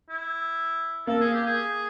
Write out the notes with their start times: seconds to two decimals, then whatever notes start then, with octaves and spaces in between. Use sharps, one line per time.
0.09 E4
1.07 A#3 A4
1.21 G#4
1.34 G4
1.46 G#4